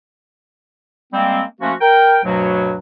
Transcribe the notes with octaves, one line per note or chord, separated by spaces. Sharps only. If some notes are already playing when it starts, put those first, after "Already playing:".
G3 G#3 A#3 C4
F3 A3 A#3 C#4 F#4
A#4 G5
D2 G2 B2 F#3